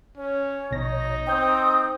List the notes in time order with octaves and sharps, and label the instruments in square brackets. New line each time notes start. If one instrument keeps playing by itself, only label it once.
[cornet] C#4 [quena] C#5
[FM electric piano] A#1 B2 A#6 [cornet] D#4
[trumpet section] C4 [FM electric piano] G5 G6 [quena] D#6